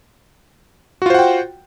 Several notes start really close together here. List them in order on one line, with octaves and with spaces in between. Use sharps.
F#4 F4 C5 F#5 G5